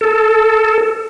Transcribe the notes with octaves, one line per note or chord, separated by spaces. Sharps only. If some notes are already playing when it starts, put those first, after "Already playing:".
A4